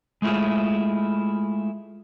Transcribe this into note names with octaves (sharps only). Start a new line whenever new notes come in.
G#3 A3 E4 F4 G#4